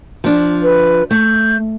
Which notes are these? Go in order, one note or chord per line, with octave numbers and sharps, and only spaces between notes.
F3 D4
B4
A3 G6